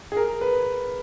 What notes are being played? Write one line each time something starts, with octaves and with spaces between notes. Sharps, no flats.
G#4
A#4
B4